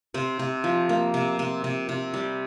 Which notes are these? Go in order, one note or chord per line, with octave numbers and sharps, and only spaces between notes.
C3 C5
C3
F3
A#3
C3
C3
C3
C3
G3